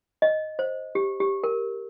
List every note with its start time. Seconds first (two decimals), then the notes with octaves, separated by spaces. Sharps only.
0.22 D#5
0.59 C5
0.95 G4
1.20 G4
1.44 A#4